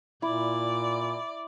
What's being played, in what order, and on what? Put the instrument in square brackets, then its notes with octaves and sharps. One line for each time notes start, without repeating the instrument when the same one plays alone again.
[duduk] A#2 [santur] E4 [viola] D5